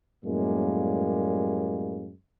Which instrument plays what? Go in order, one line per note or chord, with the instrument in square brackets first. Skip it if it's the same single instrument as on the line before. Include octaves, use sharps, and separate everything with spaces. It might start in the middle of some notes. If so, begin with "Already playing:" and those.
[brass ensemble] F#2 A2 G3 G#3 A#3